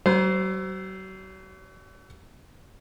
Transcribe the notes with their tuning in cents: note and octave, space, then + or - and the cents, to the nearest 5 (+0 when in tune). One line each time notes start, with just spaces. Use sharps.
F#3 +40 C5 -10